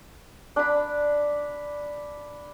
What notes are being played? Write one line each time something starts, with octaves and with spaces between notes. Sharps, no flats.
D4 B5